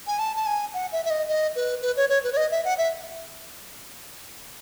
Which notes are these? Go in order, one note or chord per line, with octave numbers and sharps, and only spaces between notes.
G#5
A5
A5
G#5
F#5
E5
E5
D#5
D#5
B4
B4
C#5
C#5
B4
C#5
D#5
E5
F#5
E5